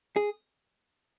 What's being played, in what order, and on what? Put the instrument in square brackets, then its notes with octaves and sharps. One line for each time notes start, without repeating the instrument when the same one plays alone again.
[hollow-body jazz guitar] G#4